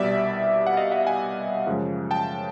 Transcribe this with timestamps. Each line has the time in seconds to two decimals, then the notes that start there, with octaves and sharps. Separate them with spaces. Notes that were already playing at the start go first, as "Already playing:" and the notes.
Already playing: C2 B2 G3 D5 E5
0.67 F#5
0.77 D#5 F5
0.92 E5 F#5
1.06 F#5 G#5
1.67 F#2 C#3 F3 G#3
2.11 G5 A5